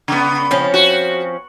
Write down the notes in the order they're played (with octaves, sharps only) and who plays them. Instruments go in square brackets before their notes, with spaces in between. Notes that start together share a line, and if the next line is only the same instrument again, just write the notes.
[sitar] C#3 B3
[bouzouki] F3 C4 C#4
[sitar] F#4